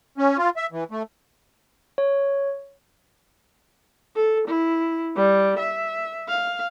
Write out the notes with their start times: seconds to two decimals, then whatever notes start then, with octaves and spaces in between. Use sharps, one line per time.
0.18 C#4
0.38 F4
0.57 E5
0.72 E3
0.91 A3
1.98 C#5
4.16 A4
4.48 E4
5.16 G3
5.59 E5
6.28 F5